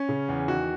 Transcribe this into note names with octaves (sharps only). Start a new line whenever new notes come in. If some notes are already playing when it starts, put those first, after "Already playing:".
Already playing: C#4
C#3
E2
D#3 F#4